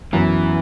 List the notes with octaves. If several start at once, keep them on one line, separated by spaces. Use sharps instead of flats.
F#2 E3 F#3 B3